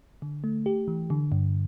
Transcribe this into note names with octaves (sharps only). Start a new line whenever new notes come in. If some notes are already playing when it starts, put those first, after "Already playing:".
D3
A3
G4
E3
D3
G2